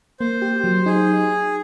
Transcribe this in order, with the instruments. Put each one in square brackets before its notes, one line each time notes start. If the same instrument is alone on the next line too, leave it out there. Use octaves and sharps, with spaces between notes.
[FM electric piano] A#3 [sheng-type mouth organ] C5
[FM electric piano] G4
F#3
[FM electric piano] D#4 [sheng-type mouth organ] G#4